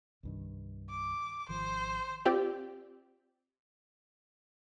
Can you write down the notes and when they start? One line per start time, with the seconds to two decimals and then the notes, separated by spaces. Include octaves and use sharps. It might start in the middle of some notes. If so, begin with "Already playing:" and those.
0.23 C2 G2 D#3
0.89 D6
1.49 G#1 D#3 F3 C5
2.25 C4 F4 G4 D5